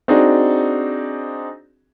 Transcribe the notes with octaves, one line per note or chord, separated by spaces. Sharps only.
C4 D4 D#4 F#4 G#4